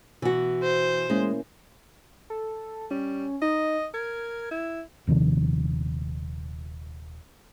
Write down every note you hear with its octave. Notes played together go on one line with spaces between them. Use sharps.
B2 E3 F#4
C5
G#3 A#3 C#4 E4
A4
G3 C#4
D#4 D#5
A#4 G#6
E4
D#1 C3 D#3 F3